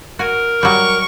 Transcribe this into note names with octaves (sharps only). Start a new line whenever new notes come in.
F#4 A#4 G#5
F#3 G3 C#6